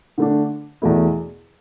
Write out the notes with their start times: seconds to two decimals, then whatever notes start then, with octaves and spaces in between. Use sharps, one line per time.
0.18 D3 A3 D4
0.82 E2 B2 A3 E4